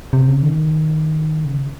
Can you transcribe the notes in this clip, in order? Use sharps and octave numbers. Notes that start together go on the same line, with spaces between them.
C3
C#3
D#3
C#3